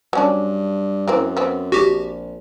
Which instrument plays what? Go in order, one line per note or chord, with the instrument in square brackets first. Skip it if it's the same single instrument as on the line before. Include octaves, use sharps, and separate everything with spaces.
[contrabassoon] G2 [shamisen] F#3 C#4 D4
[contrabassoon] F#2 [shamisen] E3 A#3 C4
[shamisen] B3 C4
[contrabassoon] A#1 [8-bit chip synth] F#4 G4